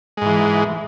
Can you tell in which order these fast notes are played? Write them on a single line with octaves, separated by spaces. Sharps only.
G#3 G#2 E3